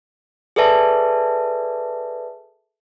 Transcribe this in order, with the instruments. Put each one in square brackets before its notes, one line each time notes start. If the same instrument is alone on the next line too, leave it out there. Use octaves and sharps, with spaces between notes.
[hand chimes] G#4 A4 B4 D5 E5 A5